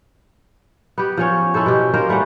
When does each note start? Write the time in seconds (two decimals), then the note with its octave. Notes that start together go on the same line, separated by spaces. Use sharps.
0.98 B3 G4
1.17 F3 C#4 C#5
1.54 C#4 E4 A4 C5
1.66 B2 G4
1.94 D#3 A#3 D#4 C5
2.09 G3 A3 C#4 F#5